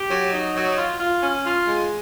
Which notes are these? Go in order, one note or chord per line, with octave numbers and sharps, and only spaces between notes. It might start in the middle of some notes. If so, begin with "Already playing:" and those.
Already playing: G4
F#3
D#4
F#3
F4
F4
C#4
F4
G#3